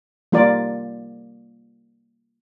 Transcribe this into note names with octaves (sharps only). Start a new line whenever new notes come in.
G3 A#3 F4 A#4 D5